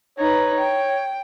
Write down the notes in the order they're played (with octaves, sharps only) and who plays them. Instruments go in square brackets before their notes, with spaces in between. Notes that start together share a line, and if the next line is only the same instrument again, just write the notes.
[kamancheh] D#4 B4 [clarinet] C#5
[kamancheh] G5